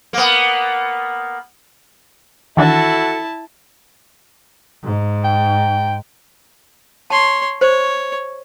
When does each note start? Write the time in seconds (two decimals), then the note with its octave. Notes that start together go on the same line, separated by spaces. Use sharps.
0.13 A#3 B3
2.57 D#3 E3 D4 E4 F#4 A4 A5
4.84 G#2
5.24 G5
7.10 C#5 A5 C6
7.61 C5 C#5